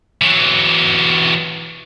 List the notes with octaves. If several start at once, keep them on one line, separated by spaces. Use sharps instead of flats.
E3 F#3